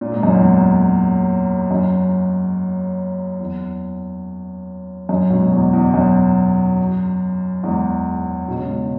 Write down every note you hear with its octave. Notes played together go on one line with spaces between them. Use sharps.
A#2
G#2
F#2
E2 G#2
F#2
E2
F#2
G#2 B2
E2 G#2
E2
F#2
E2 G#2
B2
C#3
G#2 B2